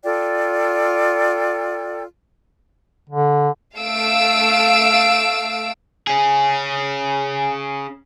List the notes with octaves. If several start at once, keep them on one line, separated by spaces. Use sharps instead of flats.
F4 A4 D5 G5
D3
A3 F5 E6 D7
C#4 G#4